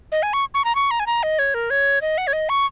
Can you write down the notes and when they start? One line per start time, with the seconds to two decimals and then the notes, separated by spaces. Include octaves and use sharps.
0.12 D#5
0.23 G#5
0.33 C#6
0.54 C#6
0.65 A#5
0.75 C#6
0.91 A#5
1.00 G#5
1.07 A#5
1.23 D#5
1.39 C#5
1.54 A#4
1.70 C#5
2.01 D#5
2.18 F#5
2.27 C#5
2.33 D#5
2.49 C#6